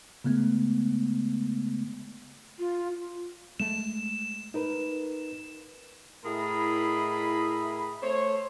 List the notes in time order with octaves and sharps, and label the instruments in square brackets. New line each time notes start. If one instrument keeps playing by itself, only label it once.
[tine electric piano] C#3 G#3 A3 B3
[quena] F4
[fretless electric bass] G#3 A3 [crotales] E7
[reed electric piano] D#4 A#4 B4
[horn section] A2 E4 G#4 A#4 D#5 B5
A3 C5 C#5